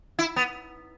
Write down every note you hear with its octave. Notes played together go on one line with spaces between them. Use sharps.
E4
B3